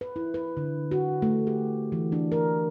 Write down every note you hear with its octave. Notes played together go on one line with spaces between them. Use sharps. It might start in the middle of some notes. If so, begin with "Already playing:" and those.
B4
E4
B4
D3
F#4
A3
G4
E3
D4
A#4